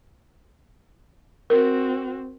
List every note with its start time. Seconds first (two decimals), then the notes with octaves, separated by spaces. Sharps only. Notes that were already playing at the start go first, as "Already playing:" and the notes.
1.50 C4 F#4 A#4